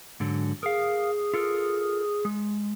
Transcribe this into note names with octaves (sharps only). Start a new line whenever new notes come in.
G#2 D3 F#3
G#4 A#4 F5
F4 A4 A#4
G#3